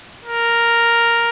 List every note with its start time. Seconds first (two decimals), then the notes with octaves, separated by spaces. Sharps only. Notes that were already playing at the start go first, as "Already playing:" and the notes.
0.25 A#4